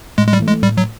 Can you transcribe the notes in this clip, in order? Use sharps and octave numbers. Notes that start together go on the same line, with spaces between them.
A2 G#3
G#3
G3
E3 A3
G#3
A2 G3
F#3